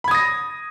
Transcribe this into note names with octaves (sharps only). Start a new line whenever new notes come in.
B5 D#6 G#6 A#6